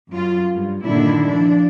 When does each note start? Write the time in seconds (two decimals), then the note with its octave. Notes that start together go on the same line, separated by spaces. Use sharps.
0.11 F#2 F4
0.55 G2
0.84 G2 A#2 D3 D#3 D4 E4
1.27 F3 D4